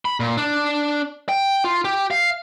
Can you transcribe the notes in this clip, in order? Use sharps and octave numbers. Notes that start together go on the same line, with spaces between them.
B5
A#2
D4
G5
F4
G4
F5